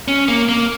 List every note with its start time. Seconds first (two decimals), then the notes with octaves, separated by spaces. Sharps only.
0.08 C#4
0.28 A#3
0.49 A#3